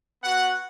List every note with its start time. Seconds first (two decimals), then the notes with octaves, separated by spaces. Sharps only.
0.23 B3 F#4 F#5